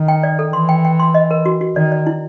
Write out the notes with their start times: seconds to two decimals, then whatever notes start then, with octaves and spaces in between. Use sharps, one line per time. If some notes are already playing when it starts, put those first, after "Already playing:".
Already playing: D#3
0.08 G5
0.23 D5
0.39 A4
0.53 E3 C6
0.69 G5
0.85 G5
1.00 C6
1.14 D#5
1.31 A#4
1.45 F#4
1.61 F#4
1.76 D#3 D5
1.92 D5
2.07 E4